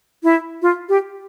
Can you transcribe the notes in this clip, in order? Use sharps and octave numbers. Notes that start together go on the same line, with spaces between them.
E4
F4
G4